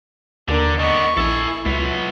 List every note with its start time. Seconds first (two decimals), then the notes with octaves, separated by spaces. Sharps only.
0.48 D#2 D3 A#3 D4 A#4
0.80 D3 B3 D#5 C#6
1.17 A#1 E4 A4 G#5
1.66 C#2 F#3 F4 B4